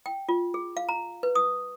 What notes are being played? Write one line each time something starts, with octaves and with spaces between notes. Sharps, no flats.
G5
F4
G#4
F5
A#5
B4
D#6